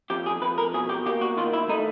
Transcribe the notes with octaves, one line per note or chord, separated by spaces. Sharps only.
F2 G4
G#4
F2 B4
A#4
B2 G#4
G4
A#3 G4
F#4
D#3 F4
E4
A3 D#4